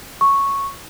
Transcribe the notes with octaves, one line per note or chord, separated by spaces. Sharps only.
C#6